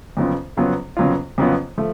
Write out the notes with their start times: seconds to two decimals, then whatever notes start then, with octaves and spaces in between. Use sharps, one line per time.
0.17 F2 C#3 F#3 B3 F4
0.57 F2 C#3 F#3 B3 F4
0.97 F2 C#3 F#3 B3 F4
1.38 F2 C#3 F#3 B3 F4
1.78 F3 A3